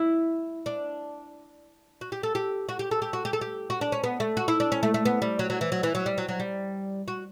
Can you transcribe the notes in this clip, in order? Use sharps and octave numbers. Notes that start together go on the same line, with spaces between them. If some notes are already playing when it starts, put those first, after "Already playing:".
Already playing: E4
D4
F#4
G4
A4
G4
F#4
G4
A4
G4
F#4
G4
A4
G4
F#4
D4
C#4
B3
A3
F#4
E4
D4
C#4
A3
A3
B3
G3
F#3
F#3
E3
F#3
E3
F#3
G3
F#3
F#3
G3
F#4